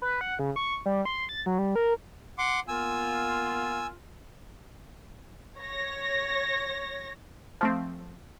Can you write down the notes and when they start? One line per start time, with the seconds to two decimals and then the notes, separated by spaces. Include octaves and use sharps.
0.02 B4
0.21 F#5
0.39 C#3
0.56 C#6
0.86 G3
1.05 C6
1.29 A6
1.46 F#3
1.58 G3
1.76 A#4
2.38 F#5 C6 D6
2.68 A#3 B3 F4 G#5 E6
5.59 C#5 A#6
7.61 F3 A3 C4